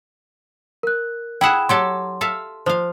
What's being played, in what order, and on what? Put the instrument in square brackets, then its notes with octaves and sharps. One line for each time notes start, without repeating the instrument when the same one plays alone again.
[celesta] A#4 F#6
[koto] E4 G#4 F#5 [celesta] G5 B5 E7
[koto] F#3 G4 A4 [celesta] C6
[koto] A4 E5 F5
[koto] F3 F5 [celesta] C5